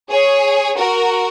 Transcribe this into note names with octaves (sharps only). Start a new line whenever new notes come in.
G#4 C#5
F#4 A#4